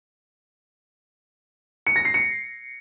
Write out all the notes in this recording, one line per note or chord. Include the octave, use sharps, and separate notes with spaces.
C#7
A#6
C7
C#7